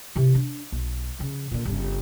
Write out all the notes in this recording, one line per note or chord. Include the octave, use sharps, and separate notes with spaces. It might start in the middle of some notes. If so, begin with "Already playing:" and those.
C3 E3
D4
B1
C#3 F3
A#2 D3
G1 C#3